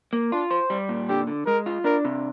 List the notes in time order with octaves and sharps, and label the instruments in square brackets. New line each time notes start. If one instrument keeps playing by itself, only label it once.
[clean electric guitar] A#3
[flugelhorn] D4 [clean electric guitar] F4
[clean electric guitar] C5
G3
A#2
[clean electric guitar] D3 [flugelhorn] G4
[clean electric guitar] D3
[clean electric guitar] G#3 [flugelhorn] A#4
[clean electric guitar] F4
[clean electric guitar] D4 [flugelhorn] A#4
[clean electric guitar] C3